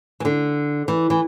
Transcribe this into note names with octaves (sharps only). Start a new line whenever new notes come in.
E3
D3
E3
E3